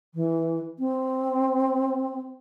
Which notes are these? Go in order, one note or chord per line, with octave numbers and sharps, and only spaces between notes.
E3
C4